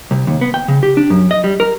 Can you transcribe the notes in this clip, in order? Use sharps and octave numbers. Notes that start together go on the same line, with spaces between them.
C2
D#2
B3
G5
C#3
G4
D4
F#2
D#5
G3
A#4